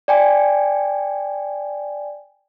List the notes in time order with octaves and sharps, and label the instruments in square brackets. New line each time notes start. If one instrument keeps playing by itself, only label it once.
[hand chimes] D5 G5 G#5